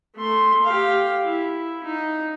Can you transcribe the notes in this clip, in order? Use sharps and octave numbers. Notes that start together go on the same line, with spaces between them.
A3 C6
G4 F5
E4
D#4